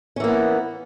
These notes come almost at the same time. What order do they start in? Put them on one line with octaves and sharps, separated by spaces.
C#4 E3 A#3 B3